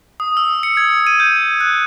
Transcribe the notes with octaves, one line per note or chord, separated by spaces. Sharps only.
D#6
E6
C#7
G#6
D#7
G6
F#6